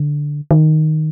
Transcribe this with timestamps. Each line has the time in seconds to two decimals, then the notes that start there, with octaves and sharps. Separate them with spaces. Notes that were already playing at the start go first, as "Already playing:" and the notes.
Already playing: D3
0.51 D#3